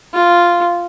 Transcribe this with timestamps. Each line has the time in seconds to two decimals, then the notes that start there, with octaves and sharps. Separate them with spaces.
0.14 F4